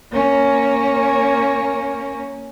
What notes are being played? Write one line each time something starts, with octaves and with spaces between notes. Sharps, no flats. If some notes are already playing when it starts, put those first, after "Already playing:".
A#3 C#4